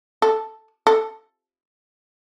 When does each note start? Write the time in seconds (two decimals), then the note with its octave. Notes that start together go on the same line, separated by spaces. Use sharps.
0.22 A4
0.87 A4